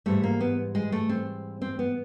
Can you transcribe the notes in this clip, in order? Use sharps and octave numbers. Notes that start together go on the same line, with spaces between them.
G#2 E3 G3 A3
A#3
B3
G#3
A3
C4
C4
B3